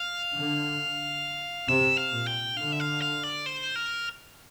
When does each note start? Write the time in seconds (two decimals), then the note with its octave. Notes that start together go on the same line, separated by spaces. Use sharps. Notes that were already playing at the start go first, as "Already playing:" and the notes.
Already playing: F5
0.34 D3
1.68 C3 E5
1.98 F5
2.13 A#2
2.27 G5
2.57 D3 F5
2.72 E5
2.80 F5
3.02 F5
3.23 D5
3.46 C5
3.75 A#4